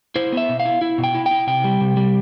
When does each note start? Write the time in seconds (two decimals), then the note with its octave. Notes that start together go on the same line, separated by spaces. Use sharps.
0.16 E4 C5
0.32 B3 E5
0.49 B2
0.60 F5
0.65 E4
0.81 E4
0.98 B2
1.04 G5
1.15 E4
1.26 G5
1.31 E4
1.47 C3 G5
1.64 G3
1.81 C3
1.97 G3